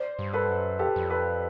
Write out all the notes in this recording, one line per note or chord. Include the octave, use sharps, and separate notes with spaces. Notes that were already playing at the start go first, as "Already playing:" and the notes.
Already playing: C5 D5
G2
A4 B4
F#2
F2 G4 A4
F2
A4 B4